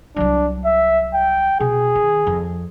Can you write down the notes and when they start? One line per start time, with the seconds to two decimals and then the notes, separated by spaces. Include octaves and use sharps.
0.16 C2 F#3 D4
0.65 E5
1.14 G5
1.60 B2 G#4
1.95 D#3
2.27 F2